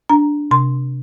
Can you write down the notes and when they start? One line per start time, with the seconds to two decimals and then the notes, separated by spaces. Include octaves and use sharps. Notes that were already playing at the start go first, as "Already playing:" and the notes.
0.09 D4 A#5
0.51 C3 C6